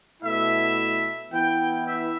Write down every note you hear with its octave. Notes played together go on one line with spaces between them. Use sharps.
B2 A3 E4 E5
E3 B3 E4 G5
E5